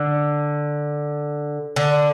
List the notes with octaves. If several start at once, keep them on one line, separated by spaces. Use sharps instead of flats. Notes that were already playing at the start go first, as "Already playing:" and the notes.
Already playing: D3
D3